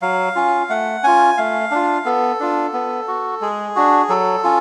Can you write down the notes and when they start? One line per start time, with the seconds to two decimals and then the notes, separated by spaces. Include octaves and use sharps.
0.02 F#3 F5
0.36 C#4 F4
0.69 A3 F#5
1.03 C#4 F4 G#5
1.38 A3 F5
1.71 D4 F4
2.05 B3 A4
2.40 D4 F4
2.73 B3
3.08 F#4
3.41 G#3 G#4
3.76 D4 F#4
4.09 F#3 A4
4.44 C#4 F4